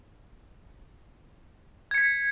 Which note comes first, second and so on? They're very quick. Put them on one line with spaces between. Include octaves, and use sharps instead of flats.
G#6 C#7 B6